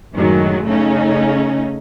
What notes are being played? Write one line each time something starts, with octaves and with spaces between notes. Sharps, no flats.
F#2 A2 D#3 F#3 G#3
C#3 A3 C#4 D#4